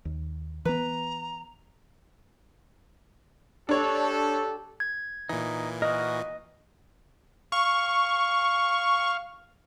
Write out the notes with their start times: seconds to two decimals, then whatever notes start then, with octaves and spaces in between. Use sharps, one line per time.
0.05 D#2
0.65 E3 B3 B4 A#5
3.69 D4 G4 A4 C#5
4.80 G#6
5.29 A#2 E3 D#4
5.82 F#4 A#4 D#5
7.52 F5 C#6